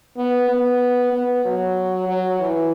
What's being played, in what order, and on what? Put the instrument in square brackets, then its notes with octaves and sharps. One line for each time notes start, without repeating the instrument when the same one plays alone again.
[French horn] B3
B3
B3
F#3
F#3
E3